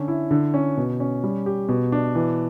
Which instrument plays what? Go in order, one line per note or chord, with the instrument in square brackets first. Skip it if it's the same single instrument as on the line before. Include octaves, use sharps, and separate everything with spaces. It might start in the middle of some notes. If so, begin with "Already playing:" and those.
Already playing: [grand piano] D3 C#4
E4
D3
C#4
B2
C#4
G3
G4
B2
D4
E3